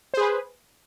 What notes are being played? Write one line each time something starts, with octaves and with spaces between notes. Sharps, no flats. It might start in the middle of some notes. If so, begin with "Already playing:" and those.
G#4 B4 C5